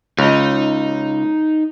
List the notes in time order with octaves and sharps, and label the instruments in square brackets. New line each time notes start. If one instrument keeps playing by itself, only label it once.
[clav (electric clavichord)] C#2 [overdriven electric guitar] D#4